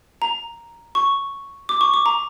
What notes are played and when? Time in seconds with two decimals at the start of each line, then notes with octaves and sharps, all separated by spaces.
0.22 A#5
0.95 C#6
1.69 D6
1.81 C#6
1.94 D6
2.06 A#5